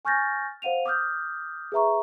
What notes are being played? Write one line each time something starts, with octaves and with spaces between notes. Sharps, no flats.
G#5 C#6 F6 G6 A6 A#6
C5 F5 F#5 D#7 F7
D6 D#6 F6 G6
G#4 B4 E5 A#5 C#6